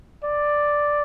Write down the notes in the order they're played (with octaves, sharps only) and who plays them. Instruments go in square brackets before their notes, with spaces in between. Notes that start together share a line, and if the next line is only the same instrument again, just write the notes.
[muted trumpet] D5